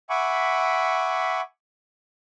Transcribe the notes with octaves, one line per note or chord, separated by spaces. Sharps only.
E5 F#5 G#5 B5 C#6 D6